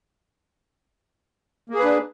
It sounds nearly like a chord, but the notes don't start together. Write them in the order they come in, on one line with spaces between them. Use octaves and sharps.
A#3 G#4 B4 D4